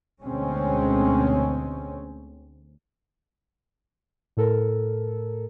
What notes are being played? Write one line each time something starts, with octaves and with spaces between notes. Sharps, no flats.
D2 B2 G#3 C4 C#4
A2 A4 A#4